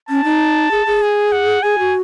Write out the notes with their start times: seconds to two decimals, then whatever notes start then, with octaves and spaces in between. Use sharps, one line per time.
0.09 C#4 A5
0.24 D#4
0.71 G#4
0.87 G#4
1.02 G#5
1.32 F#5
1.63 G#4 G#5
1.79 F#4